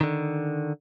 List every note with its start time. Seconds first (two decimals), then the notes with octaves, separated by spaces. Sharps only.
0.01 D3 D#3